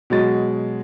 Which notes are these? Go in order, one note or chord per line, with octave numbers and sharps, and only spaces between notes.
B2 F#3 G#3 A6